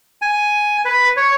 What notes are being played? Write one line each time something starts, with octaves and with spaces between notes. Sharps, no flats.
G#5
B4
C#5